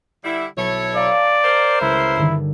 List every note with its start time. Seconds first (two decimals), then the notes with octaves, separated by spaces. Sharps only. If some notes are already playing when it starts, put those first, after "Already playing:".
0.24 D3 G3 E4
0.57 B1 E4 A4 C#5
0.96 D5 F5 A5 A#5
1.44 A#4 C5
1.81 C#2 E4
2.16 G2 D3 D#3